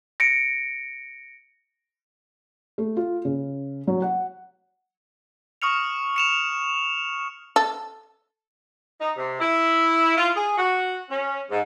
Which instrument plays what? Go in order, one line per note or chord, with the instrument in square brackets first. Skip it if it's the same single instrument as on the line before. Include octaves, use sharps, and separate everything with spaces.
[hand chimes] A#6 C#7 D7
[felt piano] A3
F4
C#3
F#3
F#5
[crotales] C#6 D#6 F6 C#7 F7
C#7 E7 F7
[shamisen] A4
[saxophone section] D#4
C3
E4
F4
G#4
F#4
C#4
G#2